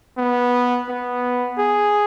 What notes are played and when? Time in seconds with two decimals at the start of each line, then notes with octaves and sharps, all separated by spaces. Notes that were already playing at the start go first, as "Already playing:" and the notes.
0.18 B3
0.89 B3
1.58 G#4